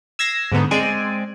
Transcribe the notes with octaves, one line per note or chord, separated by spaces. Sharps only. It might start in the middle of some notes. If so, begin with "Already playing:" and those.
E6 G#6 A#6 C7
G#2 D3 B3 D#4
G#3 C4 D5 G#5